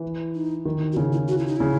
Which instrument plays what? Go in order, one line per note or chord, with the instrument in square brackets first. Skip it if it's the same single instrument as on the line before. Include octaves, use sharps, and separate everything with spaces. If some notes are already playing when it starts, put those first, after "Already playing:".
Already playing: [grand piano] E3
[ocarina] D#4
[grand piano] D#3
[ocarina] F#4
[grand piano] C#3 [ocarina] E4
[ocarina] E4
F#4
E4
D#4
[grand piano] C#3 [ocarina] E4